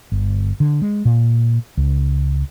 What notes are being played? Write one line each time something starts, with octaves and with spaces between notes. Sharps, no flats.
G1
D3
G#3
A#2
C#2